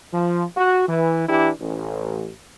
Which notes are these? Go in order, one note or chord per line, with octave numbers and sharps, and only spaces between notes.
F3
F#4
E3
E3 D4 E4 G4
A1